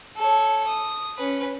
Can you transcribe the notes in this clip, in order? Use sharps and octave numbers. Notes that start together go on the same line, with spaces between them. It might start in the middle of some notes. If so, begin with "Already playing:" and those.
A4 C#5
D#6
C#4 B4